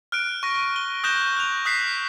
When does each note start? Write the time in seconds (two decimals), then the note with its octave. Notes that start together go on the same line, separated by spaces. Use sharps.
0.12 F6 F#6 D7
0.43 C#6 A#6
0.76 G7
1.04 D#6 F#6 G6 A#6 E7 G7
1.37 F#6 F7
1.65 D#6 F#6 B6 C7